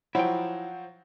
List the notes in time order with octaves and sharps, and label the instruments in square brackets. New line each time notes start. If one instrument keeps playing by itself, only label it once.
[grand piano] F3 F#3 C5 [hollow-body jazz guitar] E4 G5 [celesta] F#5